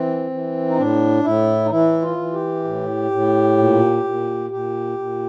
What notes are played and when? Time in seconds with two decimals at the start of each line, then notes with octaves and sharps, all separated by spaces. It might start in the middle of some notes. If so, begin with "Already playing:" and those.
Already playing: E3 C4
0.31 E3
0.69 D#4
0.77 A2 D4
1.24 A2 E4
1.66 D#4
1.71 E3 E4
2.02 F4
2.17 E3
2.33 G4
2.64 A2
3.11 A2
3.57 A#2
4.04 A#2
4.50 A#2 G4
4.98 A#2